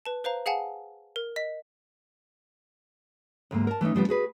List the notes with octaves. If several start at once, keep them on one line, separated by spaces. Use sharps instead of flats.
B4 A5
B4 C5 F5 A#5
G#4 F5 F#5 G#5 A5
A#4
D#5 B6
D2 G#2 F#3 A#3
A#4 A5
E3 A3 C#4 D#4
C#3 F3 G3 B3
F#4 G#4 B4